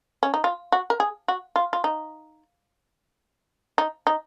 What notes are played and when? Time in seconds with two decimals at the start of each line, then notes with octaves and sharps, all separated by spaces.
0.23 C#4
0.34 D#4
0.44 F4
0.72 F#4
0.90 A#4
1.00 G#4
1.28 F#4
1.56 F4
1.73 F4
1.84 D#4
3.78 D#4
4.07 D#4